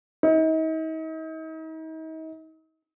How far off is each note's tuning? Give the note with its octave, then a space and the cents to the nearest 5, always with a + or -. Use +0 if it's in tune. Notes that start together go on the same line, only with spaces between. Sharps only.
D#4 +40